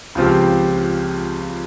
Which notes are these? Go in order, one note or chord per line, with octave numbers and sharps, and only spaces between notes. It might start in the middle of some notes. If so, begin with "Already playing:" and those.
C#2 C#3 F3 C4 G4